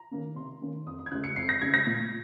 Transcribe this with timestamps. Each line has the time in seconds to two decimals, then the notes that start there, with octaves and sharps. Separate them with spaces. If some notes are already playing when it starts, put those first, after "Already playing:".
Already playing: A#5
0.11 D#3 A#3 C#4
0.36 C3 C6
0.62 D#3 A#3 C#4
0.86 F2 D#6
0.99 D#6
1.06 G#6
1.11 C#3 G#3 F#6
1.24 C#7
1.36 F2 C7
1.49 A#6
1.61 C#3 G#3 G#6
1.74 A#6
1.87 A#2